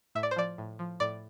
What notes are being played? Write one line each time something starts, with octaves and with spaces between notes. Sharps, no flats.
A2 E5
D5
C5
F3 D5
A2
F3
A2 D5